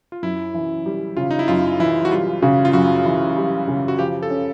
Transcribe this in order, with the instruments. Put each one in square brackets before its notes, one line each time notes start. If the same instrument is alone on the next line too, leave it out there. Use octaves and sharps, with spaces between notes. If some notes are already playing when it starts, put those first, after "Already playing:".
[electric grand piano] F4
[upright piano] F#2 [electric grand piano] E4
[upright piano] E3
G3
[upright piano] C#3 [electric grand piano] F4
[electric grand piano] D#4
E4
[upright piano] F#2 [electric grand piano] F4
[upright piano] E3 [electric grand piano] E4
[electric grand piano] F#4
[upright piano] G3 [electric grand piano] F4
[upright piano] C#3 [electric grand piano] F#4
[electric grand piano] F4
[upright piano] F#2 [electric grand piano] F#4
[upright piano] E3
G3
C#3
[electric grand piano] F#4
[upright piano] F3 [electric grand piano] G4
[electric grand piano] A4
[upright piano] C#4